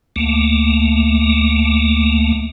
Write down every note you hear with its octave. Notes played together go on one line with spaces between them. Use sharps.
D2 A3 A#3